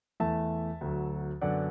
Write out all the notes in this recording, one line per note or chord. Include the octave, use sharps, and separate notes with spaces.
E2 E3 A3 E5 A5
D2 D3 F#3
F#2 D3 B3 D5 F#5